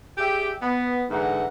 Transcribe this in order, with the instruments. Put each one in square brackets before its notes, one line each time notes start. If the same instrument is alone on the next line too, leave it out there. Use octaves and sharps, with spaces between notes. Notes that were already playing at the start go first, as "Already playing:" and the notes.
[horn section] G4 G#4 D5 E5 G5
B3
G#2 D3 E3 F#5 A#5